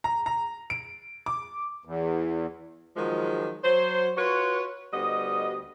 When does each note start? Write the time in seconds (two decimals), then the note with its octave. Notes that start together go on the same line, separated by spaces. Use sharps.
0.04 A#5
0.26 A#5
0.70 D7
1.26 D6
1.85 E2
2.97 D#3 F3 F#3 G#3
3.64 F#3 C5
4.18 F4 F#4 B4 C#5
4.93 D2 G3 B3 D#5